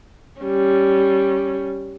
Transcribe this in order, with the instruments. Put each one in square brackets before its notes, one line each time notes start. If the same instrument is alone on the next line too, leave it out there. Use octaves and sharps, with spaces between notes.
[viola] G3 C#4